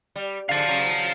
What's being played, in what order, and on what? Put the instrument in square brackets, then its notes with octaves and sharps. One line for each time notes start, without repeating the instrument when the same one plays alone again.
[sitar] G3
[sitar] G#2 D3 [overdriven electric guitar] F5 A5
[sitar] C#3 F#3